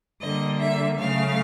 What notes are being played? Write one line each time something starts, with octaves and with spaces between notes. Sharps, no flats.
D3 G3 A#3 D#5
E5
C#3 F#3 A3 F5